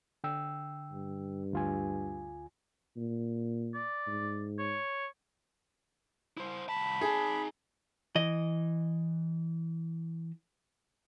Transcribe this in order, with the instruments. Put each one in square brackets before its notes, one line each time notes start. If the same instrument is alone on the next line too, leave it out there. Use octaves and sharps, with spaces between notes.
[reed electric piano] D3 G5 E6
[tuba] G2
[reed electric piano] D2 F4 G#5
[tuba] A#2
[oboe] D5
[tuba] G#2
[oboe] C#5
[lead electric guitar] E4 C5
[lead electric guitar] C2 A5 [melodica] B5
[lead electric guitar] D#4 A5 [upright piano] G#4
[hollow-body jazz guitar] E3 D#5